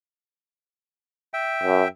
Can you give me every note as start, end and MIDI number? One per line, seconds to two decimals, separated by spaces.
1.34 1.88 76
1.34 1.88 79
1.63 1.83 42